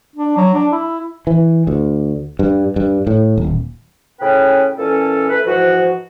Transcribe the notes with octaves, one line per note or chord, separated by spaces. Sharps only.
D4
F#3
D4
E4
E3
D2
G2
G2
A2
D#1
A2 C#3 C#4 B4 G5
A#2 E3 C#4 A4
A3 B4
G#2 E3 F3 F#4